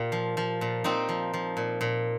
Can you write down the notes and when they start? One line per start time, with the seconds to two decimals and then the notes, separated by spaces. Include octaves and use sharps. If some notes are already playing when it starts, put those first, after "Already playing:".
Already playing: A#2 F4 G4
0.12 F3
0.37 F3
0.61 A#2
0.84 A#2 C4 D#4
1.09 F3
1.34 F3
1.57 A#2
1.81 A#2